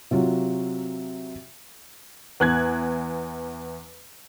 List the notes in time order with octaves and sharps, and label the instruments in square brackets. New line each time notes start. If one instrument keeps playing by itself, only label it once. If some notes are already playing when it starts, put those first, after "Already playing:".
[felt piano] C3 F#3 F4 F#4
[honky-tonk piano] E2 F#6 G#6